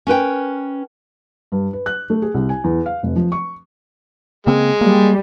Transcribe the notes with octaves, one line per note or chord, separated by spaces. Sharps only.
C#4 A#4 B4 G5
G2
B4
F#6
A3
G#4
C2
G#5
E2
F5
F1
F3
C#6
C#3 G#3 A#3 C4
G3 A#3